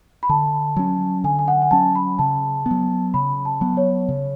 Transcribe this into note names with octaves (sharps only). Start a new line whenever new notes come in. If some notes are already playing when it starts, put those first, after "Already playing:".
B5
D3 A5
F#3 C#4
D3 G#5
G#5
F#5
G#5
F#3 C#4 A5
B5
C#3 A5
B3
F#3
C#3 B5
A5
F#3 B3
C#5
C#3